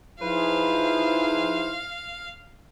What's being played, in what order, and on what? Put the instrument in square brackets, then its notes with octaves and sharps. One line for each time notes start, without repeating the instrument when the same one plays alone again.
[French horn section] F3 D#4 [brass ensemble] E4 G#4 C5 [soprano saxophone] B4 [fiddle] F5